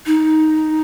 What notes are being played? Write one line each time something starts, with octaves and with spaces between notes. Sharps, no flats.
D#4